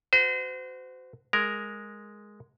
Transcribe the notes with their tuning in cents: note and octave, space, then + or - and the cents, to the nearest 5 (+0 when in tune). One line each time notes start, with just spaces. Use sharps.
F#4 +0 C5 -35
G#3 +0 A#4 +0